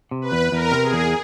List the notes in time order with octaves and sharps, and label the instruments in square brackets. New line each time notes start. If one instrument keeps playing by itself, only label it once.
[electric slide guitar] C3
[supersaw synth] B4
[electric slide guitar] E2
[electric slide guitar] E2 [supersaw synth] A#4
[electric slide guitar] C3
[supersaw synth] G#4
[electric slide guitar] E2